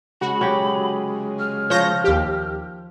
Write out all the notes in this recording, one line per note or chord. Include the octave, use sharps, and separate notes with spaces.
C#3 G#3 F#4 B5
F#3 G4
F6
F3 C#5 G6 A#6
D#2 G4